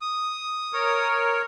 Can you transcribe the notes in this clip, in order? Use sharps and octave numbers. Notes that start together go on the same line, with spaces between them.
D#6
A#4 C#5